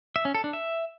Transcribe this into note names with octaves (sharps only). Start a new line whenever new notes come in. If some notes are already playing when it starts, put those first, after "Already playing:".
E5
C#4
A4
D4
E5